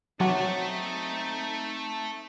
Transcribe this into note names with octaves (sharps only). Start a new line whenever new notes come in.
F#3 A3 C4 D#4 F#4